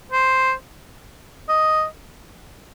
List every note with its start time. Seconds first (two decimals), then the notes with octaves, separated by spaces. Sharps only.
0.12 C5
1.49 D#5